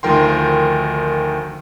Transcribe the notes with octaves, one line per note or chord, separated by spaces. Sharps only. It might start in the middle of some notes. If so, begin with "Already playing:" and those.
D2 D#3 F3 A#4 G5 C6